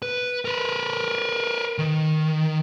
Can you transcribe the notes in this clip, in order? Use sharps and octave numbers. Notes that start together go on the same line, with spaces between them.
B4
A#4 B4
D#3